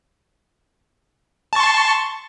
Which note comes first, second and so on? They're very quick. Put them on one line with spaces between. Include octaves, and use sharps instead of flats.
A5 C#6 C6